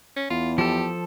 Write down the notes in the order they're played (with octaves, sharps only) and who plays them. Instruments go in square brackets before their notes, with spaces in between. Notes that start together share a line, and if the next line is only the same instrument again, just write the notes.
[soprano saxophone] C#4
[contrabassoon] E2 [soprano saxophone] F4
[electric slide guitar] F3 A4 [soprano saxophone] G4